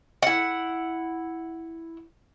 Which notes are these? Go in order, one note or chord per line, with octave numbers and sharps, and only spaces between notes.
E4 F#5